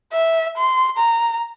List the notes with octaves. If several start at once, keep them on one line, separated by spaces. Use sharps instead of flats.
E5
C6
A#5